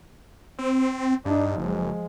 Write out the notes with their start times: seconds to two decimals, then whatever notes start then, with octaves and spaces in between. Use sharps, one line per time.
0.59 C4
1.25 G2 D4 D#4
1.58 F#1 F3 G#3